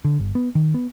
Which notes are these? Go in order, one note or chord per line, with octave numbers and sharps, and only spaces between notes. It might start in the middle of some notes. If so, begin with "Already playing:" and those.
D3
G1
B3
D#3
B3